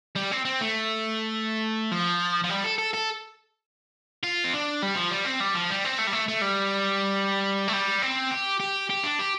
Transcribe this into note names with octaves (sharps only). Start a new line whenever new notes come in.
G3
C4
C4
A3
F3
F3
G3
A4
A4
A4
F4
C4
D4
G3
F3
G3
C4
G3
F3
G3
C4
A3
G3
A3
A3
G3
A3
G3
C4
G4
G4
G4
D4
G4